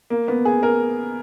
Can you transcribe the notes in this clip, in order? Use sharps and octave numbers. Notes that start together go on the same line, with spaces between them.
A#3
B3
G#4
A#4